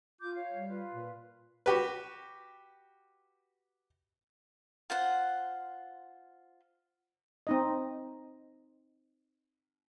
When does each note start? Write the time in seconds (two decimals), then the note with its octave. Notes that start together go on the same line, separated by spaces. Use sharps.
0.21 F4 D6 G6
0.34 C#5 F5
0.52 G3
0.69 F4 B4
0.92 A#2
1.66 F#4 G4 B4
4.90 F4 C5 F#5
7.47 C4 D#4 D#5